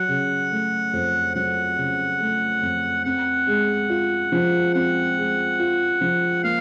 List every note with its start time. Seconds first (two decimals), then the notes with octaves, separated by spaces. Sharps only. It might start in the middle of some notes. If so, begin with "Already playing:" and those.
Already playing: F#3 F#5
0.08 C#3
0.51 A3
0.93 F2
1.35 F#3 F#5
1.78 C#3
2.20 A3
2.62 F2
3.05 C4 F#5
3.47 G#3
3.90 F4
4.32 F3
4.74 C4 F#5
5.17 G#3
5.59 F4
6.01 F3
6.44 A#3 F5